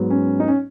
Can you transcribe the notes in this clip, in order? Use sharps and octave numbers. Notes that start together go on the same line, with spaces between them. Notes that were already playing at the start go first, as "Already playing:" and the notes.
Already playing: G#2 F#3 B3
C#4
D#4
C#4